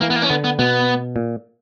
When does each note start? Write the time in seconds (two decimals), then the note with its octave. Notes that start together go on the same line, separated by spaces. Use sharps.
0.01 E3 A#3
0.10 B3
0.16 A#3
0.22 C#4
0.30 D3 B3
0.44 B3
0.59 B2 B3
1.16 A#2